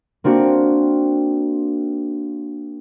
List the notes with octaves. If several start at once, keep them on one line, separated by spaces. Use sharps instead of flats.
A#3 C4 D4 F#4